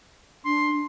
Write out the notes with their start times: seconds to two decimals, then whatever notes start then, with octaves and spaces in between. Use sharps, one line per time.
0.45 D4 C6